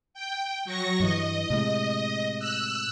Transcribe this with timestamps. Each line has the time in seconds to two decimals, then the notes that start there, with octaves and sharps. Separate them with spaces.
0.14 G5
0.65 F#3 C#6 A#6
1.00 G2 E3 D#5
1.50 A2 C3 G#3
2.39 E6 F#6